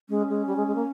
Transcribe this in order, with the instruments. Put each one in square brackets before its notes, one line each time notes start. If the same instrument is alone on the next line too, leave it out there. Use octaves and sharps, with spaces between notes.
[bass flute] G#3 [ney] C#4
[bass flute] G#3
G3
G#3
G#3
A#3